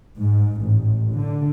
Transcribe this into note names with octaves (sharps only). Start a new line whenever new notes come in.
G#2
A1
D3